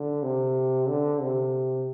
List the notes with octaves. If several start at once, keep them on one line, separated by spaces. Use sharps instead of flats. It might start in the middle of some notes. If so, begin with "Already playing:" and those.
Already playing: D3
C3
D3
C3